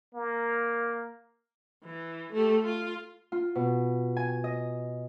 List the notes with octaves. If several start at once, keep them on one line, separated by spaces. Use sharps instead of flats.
A#3
E3
A3 G4
F4
F4
B2
G#5
D#5